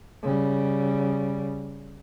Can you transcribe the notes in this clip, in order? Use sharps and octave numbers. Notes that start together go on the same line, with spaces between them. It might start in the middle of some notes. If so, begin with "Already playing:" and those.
C#3 G3